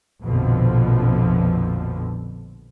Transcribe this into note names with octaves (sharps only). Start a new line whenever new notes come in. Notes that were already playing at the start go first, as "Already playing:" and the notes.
A#1 F2 B2 D3 F3